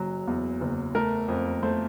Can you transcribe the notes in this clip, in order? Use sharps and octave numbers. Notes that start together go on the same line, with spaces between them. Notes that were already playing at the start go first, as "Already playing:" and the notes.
Already playing: F#1 F#3
E2
F#1
A3 A#4
F2
A3 C5